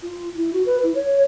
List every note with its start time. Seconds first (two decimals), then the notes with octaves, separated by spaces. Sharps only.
0.02 F4
0.35 E4
0.53 F#4
0.66 B4
0.82 E4
0.95 C#5